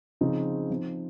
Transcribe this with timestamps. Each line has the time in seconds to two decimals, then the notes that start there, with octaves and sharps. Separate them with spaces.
0.21 C#3 F3 C4 D#4
0.70 F3 C4 D#4